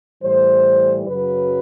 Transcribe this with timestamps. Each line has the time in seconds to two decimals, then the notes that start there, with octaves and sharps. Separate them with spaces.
0.23 A2 E3 G3 C5
1.07 F#2 C#3 F#3 B4